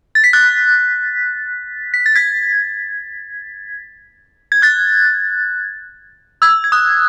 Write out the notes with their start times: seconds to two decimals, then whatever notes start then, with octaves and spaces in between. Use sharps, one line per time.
0.15 A6
0.24 B6
0.33 F#6 A6
1.94 B6
2.06 A6
2.15 G#6 B6
4.52 G#6
4.62 F#6 A6
6.42 E6 G#6
6.64 G#6
6.72 D#6 F#6